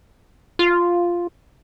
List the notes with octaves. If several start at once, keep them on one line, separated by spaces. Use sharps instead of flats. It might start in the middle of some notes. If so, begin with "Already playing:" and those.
F4